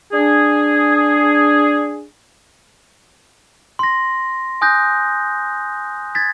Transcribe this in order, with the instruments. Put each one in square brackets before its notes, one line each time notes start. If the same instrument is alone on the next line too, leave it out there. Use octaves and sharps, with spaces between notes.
[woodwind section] D4 G#4
[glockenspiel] C6 A#6
G#5 D#6 F#6 G6 A#6
G#6 A6 B6